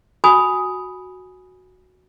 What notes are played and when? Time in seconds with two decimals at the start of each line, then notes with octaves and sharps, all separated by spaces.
0.24 F#4 G#5 B5 D#6